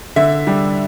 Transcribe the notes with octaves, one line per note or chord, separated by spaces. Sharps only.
D3 E5
G3 D4